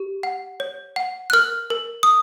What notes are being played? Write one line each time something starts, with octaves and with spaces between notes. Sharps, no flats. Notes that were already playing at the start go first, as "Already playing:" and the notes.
Already playing: G4
F#5
C#5
F#5
F#6
A#4 F6
A#4
D#6